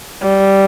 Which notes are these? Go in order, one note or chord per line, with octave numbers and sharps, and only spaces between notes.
G3